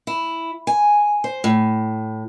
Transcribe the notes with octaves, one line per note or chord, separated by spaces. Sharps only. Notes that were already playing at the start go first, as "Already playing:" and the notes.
E4
G#5
C5
A2